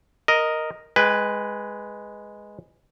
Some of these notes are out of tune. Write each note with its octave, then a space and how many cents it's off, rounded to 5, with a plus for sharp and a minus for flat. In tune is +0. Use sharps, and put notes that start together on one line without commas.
A#4 +0 D#5 +0
G#3 +0 B4 +0 G5 +45